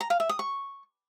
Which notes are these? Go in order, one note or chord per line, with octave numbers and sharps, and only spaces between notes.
A#5
F5
E5
D#6
C#6